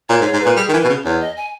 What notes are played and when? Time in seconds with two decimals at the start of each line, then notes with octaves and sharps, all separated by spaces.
0.09 A#2 C#5
0.21 G#2
0.25 C#5
0.33 G#2
0.41 A#2 B4
0.56 G3 G#4
0.69 D#3 A#4
0.73 E3
0.81 B4
0.84 B2
0.89 C#3
1.05 E2 C#5
1.21 D#5
1.37 G#5